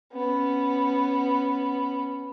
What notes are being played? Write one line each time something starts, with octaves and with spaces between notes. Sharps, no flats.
B3 C#4